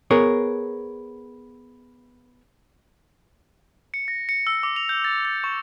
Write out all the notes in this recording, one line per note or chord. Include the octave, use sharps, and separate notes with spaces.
B3 G#4 A#4 C#5
C#7
A#6
C#7
E6
D6
F7
G6
A6
A6
C#6